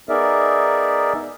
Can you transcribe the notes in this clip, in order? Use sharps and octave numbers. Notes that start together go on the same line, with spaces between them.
B3 D#4 G#4 A#4 D5 E5